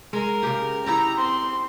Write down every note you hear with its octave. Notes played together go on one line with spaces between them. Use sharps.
G#3 A#4
C#3 G4
D#4 E4 G4 A#5
C4 C6